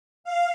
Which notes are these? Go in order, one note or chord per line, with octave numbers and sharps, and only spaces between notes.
F5